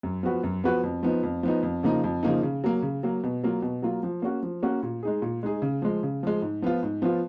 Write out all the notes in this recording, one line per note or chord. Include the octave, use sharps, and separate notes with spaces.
F#2
F3 B3 F#4 B4
F#2
F3 B3 F#4 B4
F2
F3 B3 D#4
F2
F3 B3 D#4
F2
C#3 F3 A#3 D#4
F2
C#3 F3 A#3 D#4
C#3
F#3 A#3
C#3
F#3 A#3
B2
F#3 A#3 F4
B2
F#3 A#3 F4
F3
A#3 C#4 F#4
F3
A#3 C#4 F#4
A#2
G#3 D#4 G#4
A#2
G#3 D#4 G#4
C#3
F3 G#3
C#3
F3 G#3
G#2
F3 B3 F4
G#2
F3 B3 F4